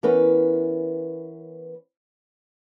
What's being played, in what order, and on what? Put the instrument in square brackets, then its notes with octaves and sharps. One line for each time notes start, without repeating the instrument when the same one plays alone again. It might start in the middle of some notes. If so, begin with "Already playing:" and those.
[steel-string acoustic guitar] E3 B3 C#4 A#4 B4